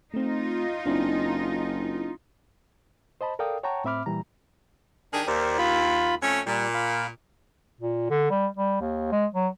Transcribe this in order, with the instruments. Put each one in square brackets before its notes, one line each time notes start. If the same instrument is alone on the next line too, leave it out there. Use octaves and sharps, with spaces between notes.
[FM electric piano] A3 C4 [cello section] D#4 F4
[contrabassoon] F#1 [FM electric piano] C4 D4 E4
[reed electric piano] C5 D#5 A5 B5
A4 A#4 D5 F5 G5 D#6
C#5 F#5 G5 A5 A#5 C#6
A2 C4 E5 B5 D6 F6
A#2 E3 G3 A#5
[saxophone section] D#3 G4 G#4 [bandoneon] D4
[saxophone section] D#2 [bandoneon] A#4 C5 D5
[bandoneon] F4 B5
[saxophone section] F2 A3 C#4
[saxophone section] A#2 [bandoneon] G3
[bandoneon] F5 B5
[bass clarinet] A#2
D3
G3
G3
D#2
G#3
F#3